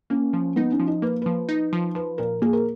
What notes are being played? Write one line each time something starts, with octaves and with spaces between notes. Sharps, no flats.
A#3 C#4
F3
B3 D#4
C#4
F3
D#4
A#3 B4
F3 B4
D#4
F3
F3 B4
A#2 A#4
A#3 G#4
A#4